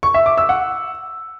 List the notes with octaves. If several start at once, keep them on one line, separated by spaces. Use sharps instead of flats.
C#6
E5
D6
E6
F#5